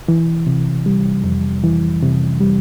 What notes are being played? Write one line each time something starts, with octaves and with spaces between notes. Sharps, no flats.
E3
C3
G3
F2
E3
C3
G3